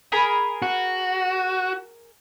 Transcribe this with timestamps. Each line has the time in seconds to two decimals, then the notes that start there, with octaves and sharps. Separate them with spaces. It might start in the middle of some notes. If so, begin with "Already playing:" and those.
0.12 G#4 A#4 B5
0.62 F#4